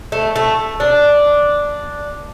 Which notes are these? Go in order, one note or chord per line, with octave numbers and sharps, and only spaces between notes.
A3
A3
D4